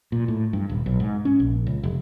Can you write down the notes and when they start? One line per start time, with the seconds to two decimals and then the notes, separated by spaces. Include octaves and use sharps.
0.12 A#2
0.28 A2
0.53 G2
0.69 D#1
0.86 B1
1.00 G#2
1.25 C#4
1.40 A#1
1.67 C#2
1.83 F1